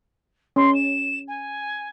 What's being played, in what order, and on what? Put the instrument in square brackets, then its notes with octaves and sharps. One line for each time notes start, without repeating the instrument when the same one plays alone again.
[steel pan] C#4 [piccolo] C6
[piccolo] E7
G#5